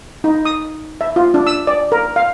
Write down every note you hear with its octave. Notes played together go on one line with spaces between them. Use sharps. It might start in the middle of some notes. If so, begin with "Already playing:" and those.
D#4
D#6
E5
F4
D4
E6
D5
A#4
F5